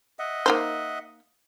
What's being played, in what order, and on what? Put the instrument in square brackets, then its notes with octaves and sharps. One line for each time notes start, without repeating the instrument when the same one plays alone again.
[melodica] D#5 E5 F#5
[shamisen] A#3 D#4 C5